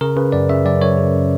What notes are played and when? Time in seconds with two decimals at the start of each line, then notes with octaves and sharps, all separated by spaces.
0.01 C#3 A#4
0.16 C#3 B4
0.32 F#2 D5
0.49 C#3 E5
0.65 F#2 D5
0.81 F#2 C#5
0.97 C#3